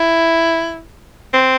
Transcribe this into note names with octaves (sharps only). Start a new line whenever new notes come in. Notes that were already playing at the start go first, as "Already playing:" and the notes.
Already playing: E4
C4